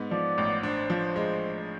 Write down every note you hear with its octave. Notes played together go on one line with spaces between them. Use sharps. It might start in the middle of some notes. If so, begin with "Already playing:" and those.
Already playing: G#2 B3
F3 D5
A1
D4 C5
F3
G#3